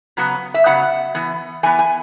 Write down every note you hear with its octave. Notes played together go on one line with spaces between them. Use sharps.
C#3 F#3 B3
E5
C#3 F#3 B3 F#5
E3 B3
E3 B3 G#5
G#5